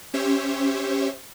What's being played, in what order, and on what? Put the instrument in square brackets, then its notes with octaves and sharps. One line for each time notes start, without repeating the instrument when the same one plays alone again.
[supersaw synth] C#4 G4 C5 C#5 E5